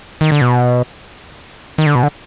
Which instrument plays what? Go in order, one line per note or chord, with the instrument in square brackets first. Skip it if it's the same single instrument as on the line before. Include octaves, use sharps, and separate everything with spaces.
[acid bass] D#3
D3
B2
D#3
D3
B2
D3